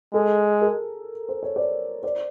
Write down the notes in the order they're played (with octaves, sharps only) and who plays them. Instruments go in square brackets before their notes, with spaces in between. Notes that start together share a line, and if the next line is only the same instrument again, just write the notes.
[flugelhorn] G#3 [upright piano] A4
[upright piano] G#4 A#4
C5
C#5
C5 D5
C5 D5